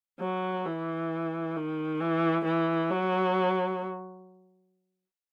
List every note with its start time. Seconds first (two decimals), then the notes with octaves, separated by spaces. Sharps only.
0.20 F#3
0.65 E3
1.56 D#3
2.01 E3
2.45 E3
2.90 F#3